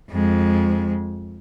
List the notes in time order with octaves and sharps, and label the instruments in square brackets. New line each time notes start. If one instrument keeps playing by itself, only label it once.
[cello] F2 G#3